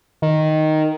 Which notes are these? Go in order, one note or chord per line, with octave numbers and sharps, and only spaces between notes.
D#3